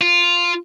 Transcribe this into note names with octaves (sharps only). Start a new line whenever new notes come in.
F4